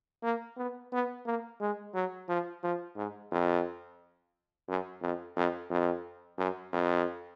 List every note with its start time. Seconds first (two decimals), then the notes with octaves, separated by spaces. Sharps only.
0.23 A#3
0.57 B3
0.93 B3
1.26 A#3
1.61 G#3
1.94 F#3
2.29 F3
2.64 F3
2.96 G#2
3.32 F2
4.68 F#2
5.02 F2
5.36 F2
5.71 F2
6.38 F#2
6.72 F2